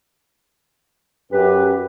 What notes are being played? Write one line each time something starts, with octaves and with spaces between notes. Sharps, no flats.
F#2 G4 B4